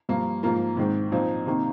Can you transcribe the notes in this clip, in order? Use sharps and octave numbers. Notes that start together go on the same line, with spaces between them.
G2 F3 A#3
G#2 F3 A#3 F4 A#4
G#2 D#3 G#3 C4
A#2 F3 C4 D#4
C3 D#3 A#3 D#4